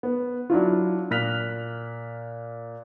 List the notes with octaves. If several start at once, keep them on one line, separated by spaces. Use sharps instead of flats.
B3
F#3 D4 E4 F4
A#2 F6 F#6 B6 F7